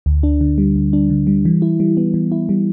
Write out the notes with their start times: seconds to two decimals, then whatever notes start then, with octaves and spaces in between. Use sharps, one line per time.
0.06 D2
0.23 D4
0.41 D3
0.58 G3
0.76 D2
0.93 D4
1.10 D3
1.27 G3
1.45 E3
1.62 E4
1.80 G3
1.97 B3
2.14 E3
2.32 E4
2.49 G3